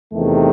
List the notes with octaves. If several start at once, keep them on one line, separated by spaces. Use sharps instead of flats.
E2 C3 D#3 A3